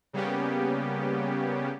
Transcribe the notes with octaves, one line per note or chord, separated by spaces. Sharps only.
C#3 G3 A#3 B3 C#4 G4